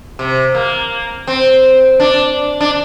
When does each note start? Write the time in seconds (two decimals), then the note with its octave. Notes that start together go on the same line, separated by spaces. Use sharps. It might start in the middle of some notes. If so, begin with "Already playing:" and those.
0.19 C3
0.55 A#3
1.27 C4
2.00 D4
2.61 D4